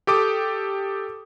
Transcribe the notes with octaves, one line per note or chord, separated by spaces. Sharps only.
G4 A4 D6 D#6